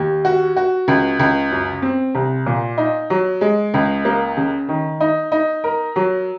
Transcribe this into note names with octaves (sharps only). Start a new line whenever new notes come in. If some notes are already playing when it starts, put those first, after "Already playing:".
Already playing: D#2
F#4
F#4
C#2
C#2
F#2
C4
C2
A#2
D#4
F#3
G#3
C#2
A#3
C#3
D#3
D#4
D#4
A#4
F#3